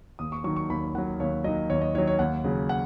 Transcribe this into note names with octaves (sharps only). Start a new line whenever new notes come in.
D#2 D#6
C#6
D#3 F#3 C#6
C#6
D#2 B5
D#3 F#3 F#5
D#2 C#5
D#3 F#3 D#5
D#2 C#5
D#5
D#3 F#3 C#5
C#5
D#2 F#5
C#3 F#3
F#5